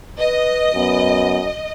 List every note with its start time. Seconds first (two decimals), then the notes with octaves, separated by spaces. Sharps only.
0.18 B4 D#5
0.75 F#2 B3